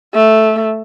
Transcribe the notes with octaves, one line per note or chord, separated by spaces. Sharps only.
A3